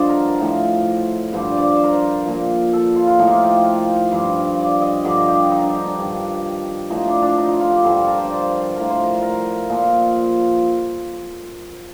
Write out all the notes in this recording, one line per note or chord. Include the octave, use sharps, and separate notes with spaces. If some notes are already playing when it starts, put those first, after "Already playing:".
Already playing: G2 D3 F3 C5 D5 D#5
A#4
A#4
A2 F3
G2 D3 F3 C5
D5
D5
D5
C5
A#4
C5
A#2 F3
A4
F4
F4
A2 F3 D#4
F4 G4
G4
A#4
G2 F3
D5
D#5
G2 D3 F3 D5
D#5
G4
F4
D#4
D4
D#4
D4
G2 D#3
A2 F3 D#4
D4
D4
D#4
F4
F4
G4
G2 D3 F3 A4
A4
A#4
C5
D5
C5
A2 F3 A#4
C5
A#4
A#4
A#2 F3